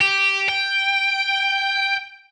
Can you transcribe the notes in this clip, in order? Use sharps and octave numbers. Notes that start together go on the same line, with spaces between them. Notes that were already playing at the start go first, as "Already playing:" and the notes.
G4
G5